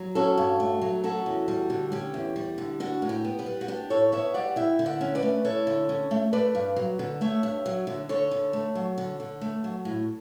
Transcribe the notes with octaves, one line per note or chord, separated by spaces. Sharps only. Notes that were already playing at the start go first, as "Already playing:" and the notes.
Already playing: F#3
C#4 F#4 A4
G2
A3
F#3
C#4 F#4 A4
E2
G3
D3
C#4 G4
E2
G3
D3
D4 F#4
A2
G4
B3
G4 B4
G3
F#4
D4 G4
A2 A4 C#5
B3 C#5 E5
G3 D5 F#5
E4 E5 G5
D3
D5 F#5
C#4
B4 D5
A3
E4 A4 C#5
D3
C#4
A3
A3 B4 D5
G2
F#3
D3
A3 C#5 E5
G2
F#3
D3
D3 A4 C#5
D3
A3
F#3
D3
D3
A3
F#3
A2